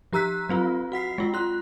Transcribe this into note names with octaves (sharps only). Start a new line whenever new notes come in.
F3 G4 A#5 E6 F#6 B6
F#3 C4 F4
F#4 F#5 B6 C7
G#3 F4
F4 C6 F#6